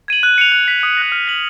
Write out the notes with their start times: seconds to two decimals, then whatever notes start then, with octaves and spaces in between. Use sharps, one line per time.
0.08 G#6 D#7 F#7
0.23 F#6
0.38 C#7 F7
0.52 F#6
0.68 B6 F7
0.83 D#6
0.97 F#6 A#6
1.12 F6
1.28 B6 F#7